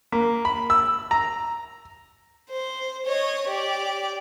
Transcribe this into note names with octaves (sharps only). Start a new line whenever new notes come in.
A#3
B5
E6
A#5
C5
C#5 D#5
G4 D5